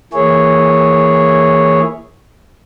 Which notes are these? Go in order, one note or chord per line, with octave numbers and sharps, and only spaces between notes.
E3 A#3 E4 G#4 C#5